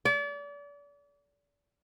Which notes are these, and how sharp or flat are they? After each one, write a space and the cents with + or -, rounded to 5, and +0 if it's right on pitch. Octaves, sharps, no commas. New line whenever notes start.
D5 -35